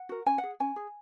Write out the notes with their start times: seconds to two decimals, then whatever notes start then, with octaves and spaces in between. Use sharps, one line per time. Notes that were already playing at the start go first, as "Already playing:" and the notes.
Already playing: F#5
0.09 F#4 A#4
0.26 C#4 G#5
0.38 F#5
0.43 G#4
0.60 C#4 G#5
0.76 G#4